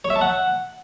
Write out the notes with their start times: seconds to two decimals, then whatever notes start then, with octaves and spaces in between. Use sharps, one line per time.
0.05 C#5
0.10 E5
0.16 A5
0.21 F#5